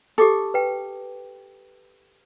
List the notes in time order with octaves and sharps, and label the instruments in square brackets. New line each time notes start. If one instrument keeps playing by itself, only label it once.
[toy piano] G4 D6 D#6 [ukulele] A4
[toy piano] B4 G5